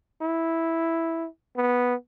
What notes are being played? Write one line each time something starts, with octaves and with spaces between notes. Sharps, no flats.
E4
B3